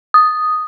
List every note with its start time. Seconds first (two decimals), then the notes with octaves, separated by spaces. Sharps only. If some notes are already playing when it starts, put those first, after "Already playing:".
0.14 D#6